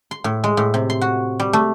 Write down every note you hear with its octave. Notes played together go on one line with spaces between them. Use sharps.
C6
A2
G#3
A2
C3
C6
F#4
G3
A3